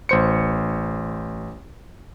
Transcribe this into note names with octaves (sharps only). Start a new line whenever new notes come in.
A1 C5 C#7